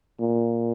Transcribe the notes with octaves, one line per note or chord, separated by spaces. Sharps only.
A#2